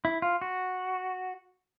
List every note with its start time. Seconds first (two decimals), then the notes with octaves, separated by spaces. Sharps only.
0.05 E4
0.22 F4
0.42 F#4